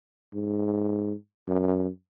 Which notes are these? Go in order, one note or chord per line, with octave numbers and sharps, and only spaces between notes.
G#2
F#2